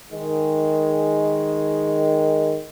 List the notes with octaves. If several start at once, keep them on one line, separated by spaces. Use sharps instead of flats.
D#3 G#3